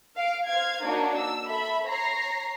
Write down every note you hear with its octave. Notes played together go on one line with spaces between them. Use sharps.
F5 D7
C5 F5 G#6
A#3 D4 D#4 F#4 C#5
E6
A4 E5 B5
C#5 A#5 A#6 C7